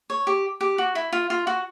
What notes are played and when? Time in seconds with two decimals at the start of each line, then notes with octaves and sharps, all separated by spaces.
0.10 C#5
0.27 G4
0.61 G4
0.78 F#4
0.95 E4
1.12 F4
1.30 F4
1.47 F#4